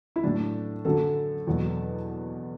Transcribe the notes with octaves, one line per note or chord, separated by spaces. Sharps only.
E4
A2 F#3 D4
F#2 D3 F#3 A4
E2 B2 F#3